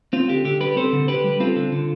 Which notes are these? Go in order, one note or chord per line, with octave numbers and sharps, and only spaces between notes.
C4 F4
D3 G4
D3 G4
G3 G4 B4
C4 A4 C5
D3
D3 G4 B4
G3
C4 F4 A4
D3
D3